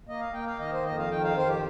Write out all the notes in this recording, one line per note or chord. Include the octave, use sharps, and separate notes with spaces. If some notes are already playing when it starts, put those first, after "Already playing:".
A#3 D#5
F5
A#3 G5
F5
D#3 D#5
C5
F2 D#5
F5
D#3 G5
F5
F2 C5
G4